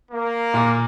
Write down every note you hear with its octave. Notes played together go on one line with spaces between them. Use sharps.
A#3
A#2